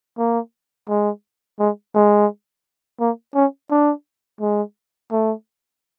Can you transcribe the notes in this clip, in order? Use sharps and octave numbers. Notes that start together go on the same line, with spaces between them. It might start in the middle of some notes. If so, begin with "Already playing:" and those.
A#3
G#3
G#3
G#3
A#3
C#4
D4
G#3
A3